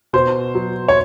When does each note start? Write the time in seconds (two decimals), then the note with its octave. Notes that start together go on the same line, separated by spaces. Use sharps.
0.13 B2 C5
0.55 F#3
0.88 C#5